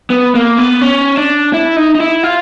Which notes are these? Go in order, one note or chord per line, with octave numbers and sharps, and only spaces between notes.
B3
A#3
B3
C#4
D4
E4
D#4
D#4
E4
F4